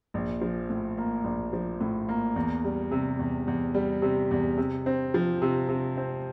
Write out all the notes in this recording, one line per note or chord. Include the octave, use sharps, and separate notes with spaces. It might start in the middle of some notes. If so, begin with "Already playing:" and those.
A#1
F3
A2
A#3
A#1
F3
A2
A#3
E2
G3
C3
E2
E2
G3
C3
E2
C3
C4
F3
C3
C3
C4